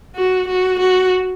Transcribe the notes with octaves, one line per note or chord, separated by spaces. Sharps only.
F#4
F#4
F#4